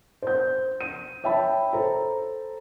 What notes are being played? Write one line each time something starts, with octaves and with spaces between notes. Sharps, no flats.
C5 G6
D#7
C#5 E5 G5 A5 B5
A4 C5 A#5